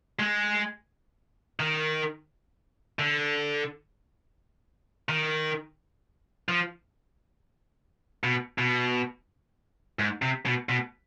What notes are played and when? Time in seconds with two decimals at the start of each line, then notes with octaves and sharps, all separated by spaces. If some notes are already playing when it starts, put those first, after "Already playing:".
0.19 G#3
1.60 D#3
2.99 D3
5.09 D#3
6.49 F3
8.24 B2
8.58 B2
9.99 G#2
10.22 C3
10.46 B2
10.69 B2